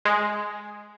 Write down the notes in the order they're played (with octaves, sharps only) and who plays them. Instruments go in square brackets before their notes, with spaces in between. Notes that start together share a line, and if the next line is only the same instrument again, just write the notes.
[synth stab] G#3